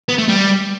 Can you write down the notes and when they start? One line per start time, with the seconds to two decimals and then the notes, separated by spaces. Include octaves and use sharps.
0.09 B3
0.18 A3
0.29 G3